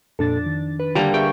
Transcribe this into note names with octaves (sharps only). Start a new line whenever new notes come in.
F2 A#2 D4 A4 A6
D#3
B4
D3 G3 A#3 A#5
G#4 E5 G5 C#6